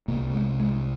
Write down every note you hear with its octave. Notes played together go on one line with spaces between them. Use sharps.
C2 C3 A#3
G#3
G#3